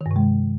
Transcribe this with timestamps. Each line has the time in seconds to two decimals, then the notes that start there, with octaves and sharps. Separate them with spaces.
0.01 D#3
0.06 G2
0.11 C3
0.16 G#3